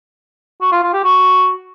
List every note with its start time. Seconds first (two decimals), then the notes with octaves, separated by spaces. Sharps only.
0.61 F#4
0.72 F4
0.83 F4
0.93 G4
1.04 F#4